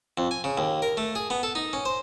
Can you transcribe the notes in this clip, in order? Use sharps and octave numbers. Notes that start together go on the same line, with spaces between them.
F2
G#5
C#3
D#2
A#4
A3
G#4
B3
A4
D#4
C#4
C5